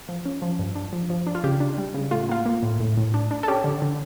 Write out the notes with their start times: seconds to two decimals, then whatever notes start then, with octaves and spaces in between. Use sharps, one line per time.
0.09 F3
0.25 C#4
0.42 F3
0.59 G2
0.75 D4
0.93 F3
1.10 F3
1.27 D4
1.35 F4
1.44 C#3 G4
1.60 D4
1.78 G3
1.94 C#3
2.11 A2 F4
2.29 A#3 F4
2.46 A#3
2.63 A2
2.80 A2
2.97 A2
3.14 D4
3.31 D4
3.43 A4
3.48 C#4 G4
3.64 D3
3.82 D3